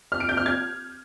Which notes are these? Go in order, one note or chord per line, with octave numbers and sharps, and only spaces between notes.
F6
D7
G6
F6
G#6